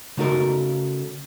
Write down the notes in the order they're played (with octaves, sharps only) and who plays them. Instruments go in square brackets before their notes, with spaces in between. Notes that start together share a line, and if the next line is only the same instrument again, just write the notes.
[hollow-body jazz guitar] C#3 A3 D#4 F#4 A4 A#4